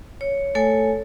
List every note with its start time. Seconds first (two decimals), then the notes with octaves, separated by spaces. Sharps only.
0.21 C#5
0.55 A3 A4 C#5 G#5